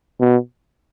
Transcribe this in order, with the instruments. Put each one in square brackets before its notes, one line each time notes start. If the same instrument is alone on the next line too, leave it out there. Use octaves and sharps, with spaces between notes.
[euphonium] B2